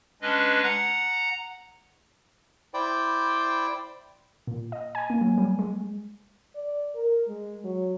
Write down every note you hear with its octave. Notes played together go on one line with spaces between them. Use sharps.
G#3 C#4 D4 B4 D#5
F#5 A#5
E4 C5 D5 G5
A#2
D#5
G#5
A#3
F#3
G3
G#3
D5
A#4
G#3
F#3